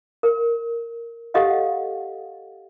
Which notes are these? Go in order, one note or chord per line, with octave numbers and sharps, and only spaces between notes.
A#4
G4 A4 D#5 F5 F#5